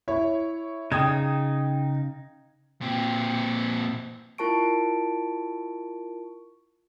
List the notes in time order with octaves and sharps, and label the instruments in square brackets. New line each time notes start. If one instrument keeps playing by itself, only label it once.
[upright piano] E4 C#5
[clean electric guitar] C#3 D#4 [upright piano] G5 D#6 G#6
[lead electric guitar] A#2 C4
[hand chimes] E4 F4 A#4 A5 C#6 D7